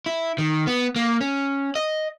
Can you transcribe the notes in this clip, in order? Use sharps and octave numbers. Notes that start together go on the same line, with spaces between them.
E4
D#3
B3
A#3
C#4
D#5